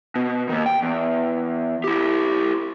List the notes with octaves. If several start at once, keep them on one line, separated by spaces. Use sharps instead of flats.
B2
D#3 A#3
G5
E2
E4 G4